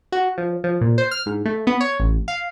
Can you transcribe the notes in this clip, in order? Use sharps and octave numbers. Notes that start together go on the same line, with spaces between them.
F#4
F3
F3
A#2
C5
F6
G#2
A3
B3
C#5
A1
F5